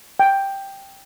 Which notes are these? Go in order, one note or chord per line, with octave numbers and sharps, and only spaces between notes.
G5